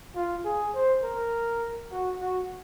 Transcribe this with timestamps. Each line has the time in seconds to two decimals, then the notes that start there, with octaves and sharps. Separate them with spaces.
0.16 F4
0.45 G#4
0.74 C5
1.03 A#4
1.92 F#4
2.21 F#4